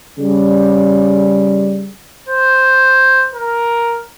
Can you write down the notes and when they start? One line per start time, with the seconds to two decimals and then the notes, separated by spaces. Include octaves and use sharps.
0.19 C#3 G3
2.28 C5
3.34 A#4